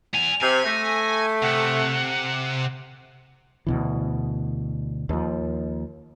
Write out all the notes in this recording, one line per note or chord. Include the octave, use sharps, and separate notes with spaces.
E2 G#5 F7
C3 G#5
A3 A#6
C3 F#5
D2 B2 E3
D#2 F3